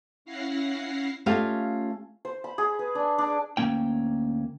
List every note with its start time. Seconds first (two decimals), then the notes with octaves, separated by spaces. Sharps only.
0.25 C#4 E4 F5 F#5 A#6 C7
1.26 A3 C#4 F4 G4 D#5 F5
2.25 C5
2.44 B5
2.58 G#4
2.79 B4
2.95 D4
3.18 D4
3.57 D2 D3 A#3 C#4 G5